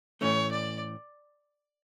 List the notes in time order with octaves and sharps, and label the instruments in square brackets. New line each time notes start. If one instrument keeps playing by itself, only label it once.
[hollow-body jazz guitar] A2 E3 A3 C#4 [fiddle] C#5
[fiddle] D5